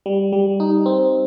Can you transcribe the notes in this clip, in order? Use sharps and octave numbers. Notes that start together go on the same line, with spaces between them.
G3
G3
D#4
C4